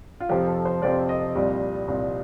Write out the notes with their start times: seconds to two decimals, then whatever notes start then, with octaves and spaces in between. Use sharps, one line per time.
0.20 F4
0.29 F2 C3 F3 C4 G4
0.48 A4
0.65 C5
0.82 F2 C3 F3 C4 D5
1.09 D#5
1.35 C2 A#2 G3
1.88 C2 A#2 G3